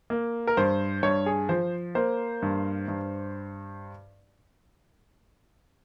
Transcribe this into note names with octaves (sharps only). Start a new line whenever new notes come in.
A#3
A#4
G2 C5
G2 C#5
G#4
F3 C5
A#3 C5
G2
G2